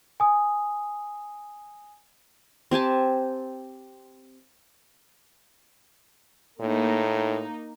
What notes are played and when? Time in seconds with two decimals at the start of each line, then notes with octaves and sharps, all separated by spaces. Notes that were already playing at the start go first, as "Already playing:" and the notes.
0.20 G#5 D#6
2.71 C4 G4 G#5 A5
6.61 A2 A#3 D#4